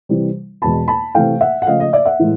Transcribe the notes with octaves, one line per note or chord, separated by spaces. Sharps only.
C3 E3 G3
E2 B2 G#3 B3 A5 B5
A5 B5
C3 E3 A3 F5 G5
E5 F#5
F#5
C#3 F3 A3 D#5 F5
D#5
D5 E5
E5 F#5
A2 E3 G#3